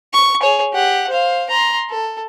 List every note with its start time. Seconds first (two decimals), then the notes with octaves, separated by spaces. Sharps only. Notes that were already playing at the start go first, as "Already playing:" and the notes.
0.13 C#6
0.42 G#4 C#5
0.73 G4 F#5
1.09 C5 F5
1.50 A#5 C6
1.90 A4